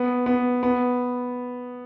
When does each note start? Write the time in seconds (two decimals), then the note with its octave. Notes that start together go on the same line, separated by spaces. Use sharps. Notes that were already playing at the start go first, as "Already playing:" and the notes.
Already playing: B3
0.26 B3
0.63 B3